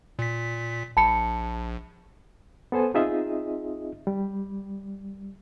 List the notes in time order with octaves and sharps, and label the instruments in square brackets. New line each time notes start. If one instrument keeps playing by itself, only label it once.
[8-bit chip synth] A#2 B6
[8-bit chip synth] A#1 [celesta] A5 B5 C#7
[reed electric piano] B3 A4 C5 G#5
C4 D#4 F4 G#4 D#5 E5
G3